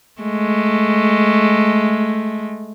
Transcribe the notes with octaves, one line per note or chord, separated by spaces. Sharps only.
G#3 A3